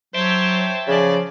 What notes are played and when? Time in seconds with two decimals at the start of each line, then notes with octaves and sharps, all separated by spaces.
0.14 F#3 C5 C#5 E5 G5 A5
0.88 C#3 F3 G#4 D5